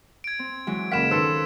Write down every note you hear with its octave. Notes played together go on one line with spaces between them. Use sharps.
G#6 D7
C4
E3 F#3 G#3
F#1 A#3 F5 F#5 B5 B6 E7
D#3 C#4 A4 B4 C5 E6